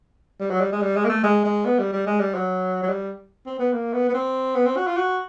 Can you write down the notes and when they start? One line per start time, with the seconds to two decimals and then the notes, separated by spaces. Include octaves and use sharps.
0.40 G3
0.50 F#3
0.61 G3
0.72 G#3
0.82 G3
0.96 G#3
1.05 A#3
1.09 A3
1.24 G#3
1.44 G#3
1.65 B3
1.79 G3
1.93 G3
2.06 G#3
2.20 G3
2.34 F#3
2.83 F#3
2.89 G3
3.46 C4
3.59 B3
3.73 A#3
3.93 B3
4.09 B3
4.14 C4
4.56 B3
4.66 C4
4.77 F#4
4.87 F4
4.97 F#4